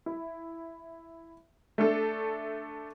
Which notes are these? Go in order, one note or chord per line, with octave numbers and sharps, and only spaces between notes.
E4
A3 D4 A4